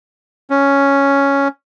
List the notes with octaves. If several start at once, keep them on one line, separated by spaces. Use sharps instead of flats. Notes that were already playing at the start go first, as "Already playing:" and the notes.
C#4